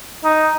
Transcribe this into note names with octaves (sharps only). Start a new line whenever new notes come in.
D#4